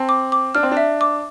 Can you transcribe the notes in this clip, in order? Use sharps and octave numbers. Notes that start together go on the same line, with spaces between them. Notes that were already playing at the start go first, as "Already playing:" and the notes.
Already playing: C4 A5
D6
D6
D4 F6
C4
D4
E5
D6